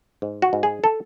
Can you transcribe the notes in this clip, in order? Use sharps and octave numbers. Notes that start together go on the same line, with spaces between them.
G#2
F#4
G#2
G#4
A4